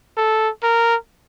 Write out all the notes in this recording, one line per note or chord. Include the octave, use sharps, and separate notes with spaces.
A4
A#4